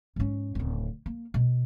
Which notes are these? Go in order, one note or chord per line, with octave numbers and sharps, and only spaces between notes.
G#2 C#4
D1 C#3
A#3
B2